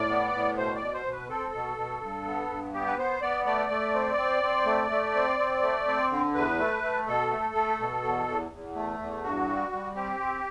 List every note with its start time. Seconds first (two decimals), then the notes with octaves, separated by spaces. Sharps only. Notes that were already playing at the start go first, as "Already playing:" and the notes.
Already playing: A2 D5
0.10 B3
0.33 A2
0.57 B2 C5
0.76 D5
0.81 B2
0.93 C5
1.06 B2
1.12 B4
1.29 C4 A4
1.53 B2
1.77 B2
2.01 G2
2.26 B3
2.50 G2
2.73 B3 G4
2.87 B4
2.97 B3 C5
3.22 B3 D5
3.46 A3 D5
3.70 A3
3.94 C4
4.18 C4
4.43 C4
4.66 A3
4.91 A3
5.15 C4
5.39 C4
5.63 A3
5.87 C4
6.10 D3
6.34 E2 B4
6.59 A3
6.83 A3
7.07 B2 A4
7.31 A3
7.55 A3
7.80 B2
8.04 E2
8.27 E2
8.52 E2
8.75 A3
8.99 E2
9.24 G2 F#4
9.48 G3
9.72 G3
9.96 C4 G4
10.19 C4